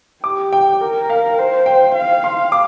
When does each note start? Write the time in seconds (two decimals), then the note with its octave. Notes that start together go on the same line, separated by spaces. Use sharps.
0.24 G4 D6
0.53 G5
0.80 A#4
1.10 F5
1.38 C5
1.66 G5
1.95 F5
2.24 C6
2.52 D6